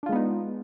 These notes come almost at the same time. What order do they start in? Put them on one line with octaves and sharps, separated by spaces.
D4 F4 G#3 B3 D#4